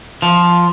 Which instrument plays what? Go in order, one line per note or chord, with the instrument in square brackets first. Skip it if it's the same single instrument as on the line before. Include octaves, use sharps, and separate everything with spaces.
[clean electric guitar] F3